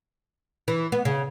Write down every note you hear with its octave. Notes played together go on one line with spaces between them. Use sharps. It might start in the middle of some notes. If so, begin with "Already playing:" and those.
E3
B3
C#3